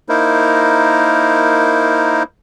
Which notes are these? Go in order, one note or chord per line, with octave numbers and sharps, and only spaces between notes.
A#3 D#4 E4 A#4 C5